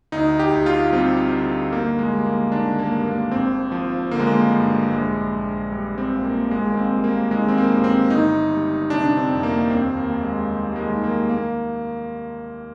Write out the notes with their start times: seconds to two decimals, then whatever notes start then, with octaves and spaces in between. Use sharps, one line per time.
0.12 D2 D#4
0.39 G4
0.52 D2
0.66 F4
0.92 G3 C4
1.32 D3
1.72 G1 A#3
1.99 G#3
2.12 G3
2.26 A#3
2.52 D#3 D4
2.79 A#3
2.92 G2
3.05 A#3
3.31 G#1 C4
3.72 F3
4.11 D3 A#3
4.19 G#3
4.27 A#3
4.52 G2
4.91 A#1 G#3
5.31 A#1
5.71 G3
5.98 C4
6.11 A#2
6.24 A#3
6.51 G#1 G#3
6.66 A#3
6.77 C4
6.91 G3
7.04 A#3
7.30 D#3 G#3
7.48 C4
7.57 A#3
7.70 G2
7.84 C4
8.10 G1 D#4
8.50 G3
8.90 C3 D4
9.05 D4
9.17 C4
9.30 F2
9.43 A#3
9.70 D#2 C4
9.97 A#3
10.09 D#2
10.23 G#3
10.50 G3
10.72 A#3
10.76 G#3
10.90 D#3
11.04 A#3
11.30 A#3